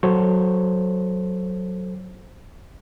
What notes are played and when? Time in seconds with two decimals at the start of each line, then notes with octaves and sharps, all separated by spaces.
0.03 F#3 A4 C5 C#5